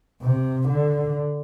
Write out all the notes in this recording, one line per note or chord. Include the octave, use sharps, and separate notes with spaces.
C3
D3